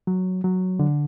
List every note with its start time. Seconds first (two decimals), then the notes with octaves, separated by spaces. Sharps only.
0.07 F#3
0.44 F#3
0.79 D3